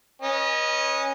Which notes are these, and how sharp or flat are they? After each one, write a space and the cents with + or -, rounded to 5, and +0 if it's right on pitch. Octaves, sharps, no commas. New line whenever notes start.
C#4 -15 B4 -40 D#5 +0